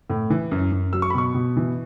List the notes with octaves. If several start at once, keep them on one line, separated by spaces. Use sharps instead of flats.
A2
E3
F#2
F#2
F#3 E6
C#6
B5
B2 C#6
B2
E3